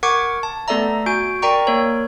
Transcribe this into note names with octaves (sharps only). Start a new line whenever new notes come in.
A#4 F#5 C#6 D6 G#6 C#7
A5
A3 B3 A4 D5 E5 A#5
F#4 G#5 G6 D7
A#4 D5 G5 A#5 C#6
A#3 A#4 C#5